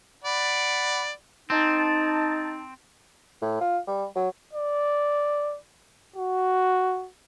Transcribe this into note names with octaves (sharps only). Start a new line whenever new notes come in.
D5 F#5 B5
C4 D#4 A5
A2
F4
G3
F#3
D5
F#4